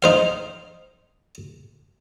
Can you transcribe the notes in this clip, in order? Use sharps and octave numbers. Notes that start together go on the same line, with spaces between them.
D#4 C5 F5